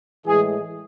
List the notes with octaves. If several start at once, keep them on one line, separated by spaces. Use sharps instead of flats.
A2 E3 G#3 G#4